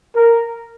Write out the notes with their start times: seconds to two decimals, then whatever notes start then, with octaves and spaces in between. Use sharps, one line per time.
0.15 A#4